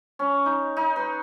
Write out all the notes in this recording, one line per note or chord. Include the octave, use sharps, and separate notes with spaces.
C#4
D#4
D#4
B4